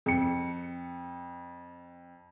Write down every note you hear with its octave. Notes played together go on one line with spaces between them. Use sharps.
F2 C#7